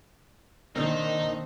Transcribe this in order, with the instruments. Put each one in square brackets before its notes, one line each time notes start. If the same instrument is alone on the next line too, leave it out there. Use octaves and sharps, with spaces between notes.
[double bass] D#3 [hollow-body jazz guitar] A#3 [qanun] C4 D4 C5 [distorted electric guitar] D#4